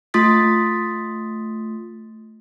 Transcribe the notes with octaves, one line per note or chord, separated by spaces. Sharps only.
A3 F4 C6 D#6 A6 B6